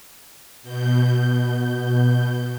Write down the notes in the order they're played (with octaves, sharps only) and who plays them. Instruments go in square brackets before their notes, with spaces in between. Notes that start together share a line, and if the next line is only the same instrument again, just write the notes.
[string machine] B2 G6